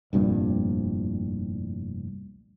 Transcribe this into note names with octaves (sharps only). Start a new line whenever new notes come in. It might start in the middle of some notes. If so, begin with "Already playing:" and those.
F1 C2 G2 A#2